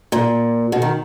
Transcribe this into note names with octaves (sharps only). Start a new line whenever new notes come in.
A#2
B2
D#3